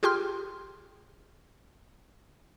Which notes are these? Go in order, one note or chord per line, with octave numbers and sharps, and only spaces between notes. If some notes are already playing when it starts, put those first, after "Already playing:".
F4 G4 G#4 G5 C6 F6